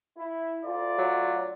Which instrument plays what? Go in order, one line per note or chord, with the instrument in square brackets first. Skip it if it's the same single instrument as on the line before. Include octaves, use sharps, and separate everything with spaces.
[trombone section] E4
[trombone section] D2 F4 [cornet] D5
[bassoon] F#3